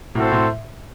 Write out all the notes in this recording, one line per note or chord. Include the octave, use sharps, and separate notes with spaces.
A2 C4 F#4 A4 C5
A2